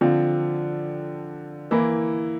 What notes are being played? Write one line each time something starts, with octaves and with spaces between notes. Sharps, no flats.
D3 F3 C4 F4
E3 A#3 E4